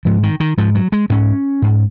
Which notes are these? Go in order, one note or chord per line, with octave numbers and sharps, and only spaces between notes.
G#2 F3
D#3
D#3
G#2 F3
F#3
G#3
G#2 C#4
G#2